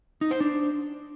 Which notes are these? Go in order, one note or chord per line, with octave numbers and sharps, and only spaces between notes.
D#4
C5
D4